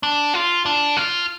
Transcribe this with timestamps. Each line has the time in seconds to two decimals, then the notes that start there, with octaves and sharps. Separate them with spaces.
0.03 D4
0.34 F4
0.66 D4
0.97 F4